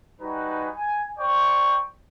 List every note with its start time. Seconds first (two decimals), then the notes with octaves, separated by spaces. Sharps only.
0.20 G3 D#4 F#4 B4 G#5
0.75 G#5
1.19 C5 D5 G5 C#6